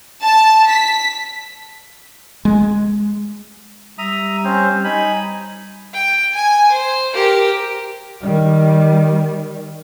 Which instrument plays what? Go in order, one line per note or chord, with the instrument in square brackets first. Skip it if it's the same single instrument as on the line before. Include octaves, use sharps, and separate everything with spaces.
[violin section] A5
B6
[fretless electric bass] G#3
[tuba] G3 [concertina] E5 A#5 D#6
[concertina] C4 C#4 C5
D#4 G#5 B5
[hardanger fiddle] G5
G#5
C5
G4 A#4
[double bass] D#3 G3